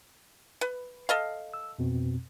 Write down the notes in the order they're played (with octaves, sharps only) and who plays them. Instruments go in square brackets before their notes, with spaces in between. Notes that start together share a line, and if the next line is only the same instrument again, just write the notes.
[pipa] B4
A4 D#5 F5
[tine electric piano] E6
F2 B2 C4